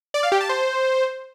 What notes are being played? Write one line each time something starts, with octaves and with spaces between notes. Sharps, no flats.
D5
F5
G4
A5
C5